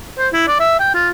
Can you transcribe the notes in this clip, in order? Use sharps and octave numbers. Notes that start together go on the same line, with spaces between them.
C5
E4
D5
E5
G5
F4